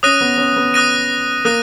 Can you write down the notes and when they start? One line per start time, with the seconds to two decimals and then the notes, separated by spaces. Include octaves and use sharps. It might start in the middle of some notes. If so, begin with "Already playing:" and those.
0.03 C#4 D#6 F#6 A#6 D#7
0.21 B3
0.38 C#4
0.56 B3
0.74 D#6 F#6 A#6 D#7
1.45 A#3 D#6 F#6 A#6 D#7